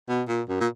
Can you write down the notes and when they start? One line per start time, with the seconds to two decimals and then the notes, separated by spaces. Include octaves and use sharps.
0.09 B2
0.28 A#2
0.49 F#2
0.60 A#2